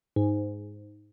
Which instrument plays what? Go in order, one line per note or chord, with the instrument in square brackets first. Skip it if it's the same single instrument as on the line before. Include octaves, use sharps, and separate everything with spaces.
[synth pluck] G#2